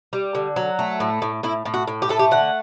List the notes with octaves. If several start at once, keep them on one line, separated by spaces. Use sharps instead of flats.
G3
D3
F#3
A3
A2
A2
A2 E4
A2
F#4
A2
G4
A3 A4
G4
D3 F#5